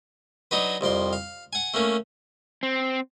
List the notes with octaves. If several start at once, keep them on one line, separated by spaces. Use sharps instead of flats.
F#3 D4 D#4 F#4 B4
C2 F2 D5 C6
F5
F#5 G#5
A3 A#3 C#4
C4